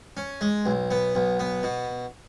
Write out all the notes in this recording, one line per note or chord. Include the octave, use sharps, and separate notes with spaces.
C#4
G#3
B1
B3
B1
B3
B2